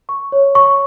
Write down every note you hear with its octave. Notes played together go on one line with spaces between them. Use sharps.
C#6
C#5
C#6